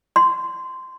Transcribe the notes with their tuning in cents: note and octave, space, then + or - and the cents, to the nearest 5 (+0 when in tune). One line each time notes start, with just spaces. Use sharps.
C6 -15